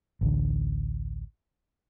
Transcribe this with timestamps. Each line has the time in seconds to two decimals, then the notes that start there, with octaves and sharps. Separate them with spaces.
0.21 A1 D2 D3